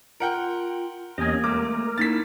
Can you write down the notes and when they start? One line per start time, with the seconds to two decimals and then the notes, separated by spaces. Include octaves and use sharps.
0.20 F4 A#4 F#5 G5
1.18 E2 A#3 C#4 G4 D#5 G#5
1.44 G#3 A3 A#4 D6
1.98 A#3 C#4 D#4 E4 A6 B6